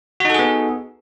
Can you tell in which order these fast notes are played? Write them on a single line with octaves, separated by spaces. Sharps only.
F#4 D#4 A4 G#4 B3